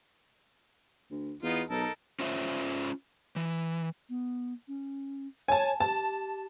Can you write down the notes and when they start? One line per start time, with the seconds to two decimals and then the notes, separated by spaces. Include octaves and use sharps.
1.11 D2
1.43 E2 B3 D#4 F4
1.70 B1 D#4 A4 A#4
2.20 C#4 F4 C5 E5
3.36 E3
4.09 B3
4.68 C#4
5.48 C#5 G#5 A5
5.80 G4 A5